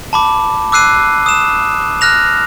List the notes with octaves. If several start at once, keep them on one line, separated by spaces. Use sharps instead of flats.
A5 B5 D6
D6 E6 F#6 C7 D#7
D#6 E7
F6 F#6 A#6 F7